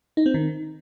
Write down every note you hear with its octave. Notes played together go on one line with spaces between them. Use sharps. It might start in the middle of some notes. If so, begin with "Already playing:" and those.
D#4
C4
D#3